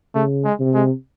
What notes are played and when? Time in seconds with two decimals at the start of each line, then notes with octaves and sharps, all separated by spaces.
0.15 C#3 A3
0.44 G#3
0.60 C3
0.75 G#3